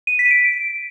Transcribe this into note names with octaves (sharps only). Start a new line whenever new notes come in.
D#7
B6
D7